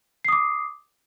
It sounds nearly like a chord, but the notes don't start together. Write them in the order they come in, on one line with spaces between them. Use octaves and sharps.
C7 D#6 D6